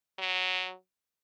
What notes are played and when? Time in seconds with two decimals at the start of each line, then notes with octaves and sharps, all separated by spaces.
0.19 F#3